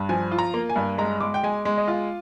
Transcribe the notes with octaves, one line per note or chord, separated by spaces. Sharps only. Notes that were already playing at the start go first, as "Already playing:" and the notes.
Already playing: G2
F3 G#5
F4
A#5
A#3
G#5
G2
G#3 A#5
G#3 D6
G5
G#3 G#5
G#3
D#5
F4 F5